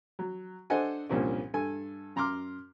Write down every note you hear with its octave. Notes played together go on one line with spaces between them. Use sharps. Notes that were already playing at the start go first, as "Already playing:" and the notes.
F#3
D4 A4 C5 D#5 F#5 G#5
C2 G2 A#2 F3 C#4
G2 A4 G#5
F#2 A#5 C6 D6 F6